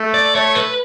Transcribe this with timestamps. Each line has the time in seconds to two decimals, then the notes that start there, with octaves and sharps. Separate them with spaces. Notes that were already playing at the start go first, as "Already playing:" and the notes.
Already playing: A3
0.14 D5
0.34 A3 C#5
0.55 B4